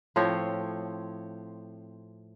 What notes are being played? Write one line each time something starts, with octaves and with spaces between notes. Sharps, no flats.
A2 F3 C4 C#5